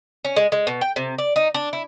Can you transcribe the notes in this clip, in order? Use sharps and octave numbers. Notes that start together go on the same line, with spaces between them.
C#4
G#3
G#3
B2
G5
C3
D5
D#4
D4
E4